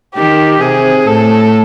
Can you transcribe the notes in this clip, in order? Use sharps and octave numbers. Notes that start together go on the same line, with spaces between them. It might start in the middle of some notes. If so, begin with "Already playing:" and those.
D#3 G4
C3 G#4
A2 A4